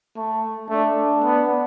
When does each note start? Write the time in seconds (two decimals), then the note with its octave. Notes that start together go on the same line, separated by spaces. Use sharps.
0.17 A3
0.70 A3 D4
1.23 B3